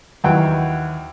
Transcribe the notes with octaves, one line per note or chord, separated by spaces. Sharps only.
D#2 E3 F#3 F#5 G5